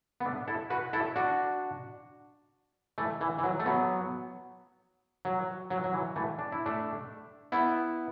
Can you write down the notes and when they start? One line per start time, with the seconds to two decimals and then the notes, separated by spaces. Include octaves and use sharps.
0.20 B3
0.25 A3 D4
0.48 E4 A4
0.70 F#4 B4
0.93 E4 A4
1.16 D4 F#4
2.98 E3 A3
3.21 E3
3.38 E3
3.44 F#3
3.60 A3
3.66 F#3 B3
5.25 F#3
5.70 F#3
5.84 F#3
5.93 E3
6.16 E3 A3
6.39 D4
6.52 E4
6.66 A3 D4
7.52 B3 E4